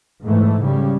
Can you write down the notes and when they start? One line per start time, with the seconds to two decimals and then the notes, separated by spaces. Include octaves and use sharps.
0.24 G#2 E3 A3
0.60 C#3 G3